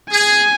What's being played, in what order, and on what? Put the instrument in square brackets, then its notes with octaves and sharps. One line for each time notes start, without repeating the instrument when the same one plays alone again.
[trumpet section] G#4 [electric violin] G#5